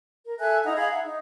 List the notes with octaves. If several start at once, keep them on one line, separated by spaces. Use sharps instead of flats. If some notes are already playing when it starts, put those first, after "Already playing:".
A#4
A4 E5 G#5 F#6
D#4 E4 F#5 A#5
G#4 F5 A#5 B5
E5 F#5
D#4